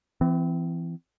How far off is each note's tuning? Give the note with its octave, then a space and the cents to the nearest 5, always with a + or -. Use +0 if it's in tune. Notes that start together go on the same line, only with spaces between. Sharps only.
E3 +25 C4 -25